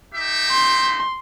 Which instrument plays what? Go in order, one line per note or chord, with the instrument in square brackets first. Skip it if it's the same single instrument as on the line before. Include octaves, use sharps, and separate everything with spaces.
[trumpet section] D#4 G4 E5
[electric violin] C6